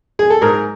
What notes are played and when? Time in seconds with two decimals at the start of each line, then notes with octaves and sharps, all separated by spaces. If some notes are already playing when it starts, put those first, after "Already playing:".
0.19 G#4
0.30 A4
0.41 G#2 G#4 A#4